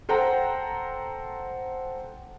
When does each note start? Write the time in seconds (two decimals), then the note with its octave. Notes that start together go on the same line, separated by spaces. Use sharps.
0.09 A4 C5 F#5 G5 A#5